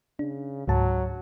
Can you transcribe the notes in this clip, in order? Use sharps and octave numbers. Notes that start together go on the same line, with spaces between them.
C#3 D4
C#2 G#2 F#3 A5